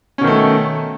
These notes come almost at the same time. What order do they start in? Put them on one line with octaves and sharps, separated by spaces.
C#4 B2 D#3 A3